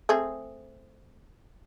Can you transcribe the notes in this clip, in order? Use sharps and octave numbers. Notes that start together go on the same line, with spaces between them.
A3 C4 G#4